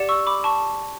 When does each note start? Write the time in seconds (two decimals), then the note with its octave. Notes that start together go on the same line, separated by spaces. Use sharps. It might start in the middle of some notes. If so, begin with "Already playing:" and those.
Already playing: G4 D5 F#5
0.09 C#6 E6
0.27 B5 D6
0.44 A5 C#6